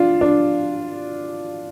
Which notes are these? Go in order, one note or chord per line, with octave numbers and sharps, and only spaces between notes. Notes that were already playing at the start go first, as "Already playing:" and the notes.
Already playing: D4 F4
D4